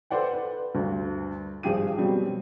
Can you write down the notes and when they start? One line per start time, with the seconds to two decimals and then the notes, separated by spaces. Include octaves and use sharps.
0.10 A4 B4 C5 D5 F#5 G5
0.33 B4
0.75 D2 G2
1.63 G#1 G2 F3 G4 G#4 D#7
1.97 B2 F#3 G3 C4 G4